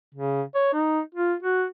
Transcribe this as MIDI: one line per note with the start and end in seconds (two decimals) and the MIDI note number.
0.15 0.42 49
0.55 0.72 73
0.74 1.00 63
1.15 1.34 65
1.43 1.65 66